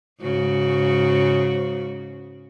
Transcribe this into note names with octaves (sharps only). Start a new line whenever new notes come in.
G#2 C#3 F#4